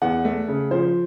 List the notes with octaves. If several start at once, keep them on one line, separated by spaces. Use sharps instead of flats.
E2 F#5
A3
C#3
F3 C5